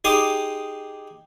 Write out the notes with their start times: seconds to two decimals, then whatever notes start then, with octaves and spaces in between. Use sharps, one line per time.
0.04 D#4 G4 G#4 C6 D6 D#6